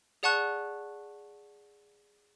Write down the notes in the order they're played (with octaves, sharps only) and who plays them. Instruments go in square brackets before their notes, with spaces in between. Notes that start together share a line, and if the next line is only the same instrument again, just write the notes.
[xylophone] G#4 D5 F#5 A5 C#6 F#6